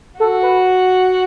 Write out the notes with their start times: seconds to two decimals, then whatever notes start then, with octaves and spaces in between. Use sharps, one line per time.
0.20 F#4 A4
0.43 B4